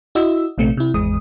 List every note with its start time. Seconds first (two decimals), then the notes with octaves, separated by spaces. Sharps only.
0.15 E4 F#4 D#5 E6
0.58 A#1 C3 A3 C4 C#7
0.77 C3 E4
0.94 G#1 E2 G#3 D#6